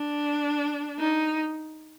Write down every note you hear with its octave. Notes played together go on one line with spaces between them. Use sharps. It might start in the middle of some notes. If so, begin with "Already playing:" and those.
Already playing: D4
D#4